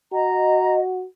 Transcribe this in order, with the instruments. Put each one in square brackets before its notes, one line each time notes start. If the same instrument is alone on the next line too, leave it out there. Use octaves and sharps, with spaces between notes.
[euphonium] F#4 [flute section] D#5 [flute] A#5